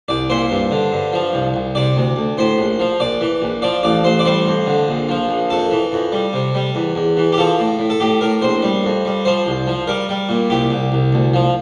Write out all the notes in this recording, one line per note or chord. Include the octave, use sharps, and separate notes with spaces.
C2 D5
A#2 C5
G2
D3
G2
F3
C2
C2
C3 D5
D2
D2
A2 C5
A#1
F3
A#1 D5
E3
A#1
F3 D5
A1 D5
A1 C5
D5
G3 C5
F2
D3
A#1
F3
A#1
F2 A4
E3
F2
G3
C3
G3
E2
E2
E3
G4
F3 A4
A2
A2
A4
A2 G4
A2 A#4
A#1 C5
G3
F2
G3
F3 C5
C2
F3
G3 A#4
G3
A#2
C2 G4
C2
C2
D2
F3